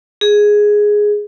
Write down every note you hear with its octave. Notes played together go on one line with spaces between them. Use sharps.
G#4